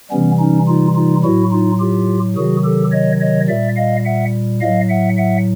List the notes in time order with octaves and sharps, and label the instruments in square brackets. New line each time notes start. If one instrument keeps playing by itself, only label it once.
[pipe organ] C3 E3 G3 B3 C#4
C#4 D#4
D#4 F4
D#4 F4
A2 F#3 E4 F#4
D#4 F4
F4 G4
C3 D#3 F#3 F#4 G#4
G4 A4
C#5 D#5
C#5 D#5
A#2 G3 D5 E5
D#5 F5
E5 F#5
A2 F#3 D#5 F5
E5 F#5
E5 F#5